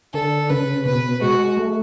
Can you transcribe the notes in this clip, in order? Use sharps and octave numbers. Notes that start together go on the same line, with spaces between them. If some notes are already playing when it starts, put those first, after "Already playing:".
D3 A4
C#3 B4
B2 B4
G#3 F#4
A3